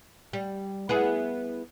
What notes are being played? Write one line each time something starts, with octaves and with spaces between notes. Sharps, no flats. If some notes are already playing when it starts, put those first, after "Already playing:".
G3
B3 E4 G#4